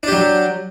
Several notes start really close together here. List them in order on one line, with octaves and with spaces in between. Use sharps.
D4 G4 F#3